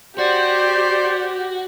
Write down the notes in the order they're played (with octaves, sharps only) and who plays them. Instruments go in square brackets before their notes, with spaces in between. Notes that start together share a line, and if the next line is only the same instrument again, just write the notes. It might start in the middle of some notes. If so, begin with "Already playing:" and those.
[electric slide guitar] F#4 [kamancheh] G4 [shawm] C5 [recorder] D5